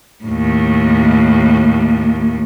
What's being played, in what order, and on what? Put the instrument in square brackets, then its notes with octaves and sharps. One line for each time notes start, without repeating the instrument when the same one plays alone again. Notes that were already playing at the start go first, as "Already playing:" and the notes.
[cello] D#2 A2